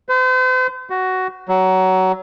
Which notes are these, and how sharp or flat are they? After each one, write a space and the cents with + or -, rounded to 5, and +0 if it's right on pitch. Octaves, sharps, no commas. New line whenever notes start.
C5 -40
F#4 +10
F#3 +20